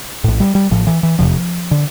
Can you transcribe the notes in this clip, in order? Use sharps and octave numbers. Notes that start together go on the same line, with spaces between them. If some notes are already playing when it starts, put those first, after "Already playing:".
A#1 A2
G3
G3
A1 A2 F3
E3
E3
F1 E2 C3 F3
D3